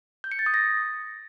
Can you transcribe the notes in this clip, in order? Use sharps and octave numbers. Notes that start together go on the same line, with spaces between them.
G6
C#7
A6
D#6
A#6